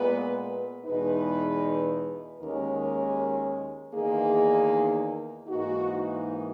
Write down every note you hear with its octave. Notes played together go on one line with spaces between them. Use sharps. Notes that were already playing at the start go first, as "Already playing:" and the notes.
Already playing: A#2 G#3 B3 B4
E2 B2 G#3 D#4 B4
D#2 D#3 G#3 C#4 A#4
E2 D#3 A#3 D#4 G#4
G#2 E3 A#3 D#4 F#4